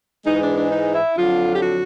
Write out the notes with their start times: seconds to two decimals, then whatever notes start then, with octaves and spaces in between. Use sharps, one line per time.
0.25 G#2 E3 G#3 D#4
0.40 D4
0.56 D4
0.71 D#4
0.93 E4
1.17 F2 D3 F#3 F4
1.55 G4
1.61 F#4